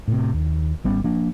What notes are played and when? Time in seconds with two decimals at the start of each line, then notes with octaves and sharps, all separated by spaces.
0.08 A2 C3
0.34 D#2
0.84 G#1 G3 B3 C#4
1.04 F3 A#3 D4